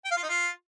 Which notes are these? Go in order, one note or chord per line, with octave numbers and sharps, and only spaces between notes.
G5
F5
F4
D#4
F4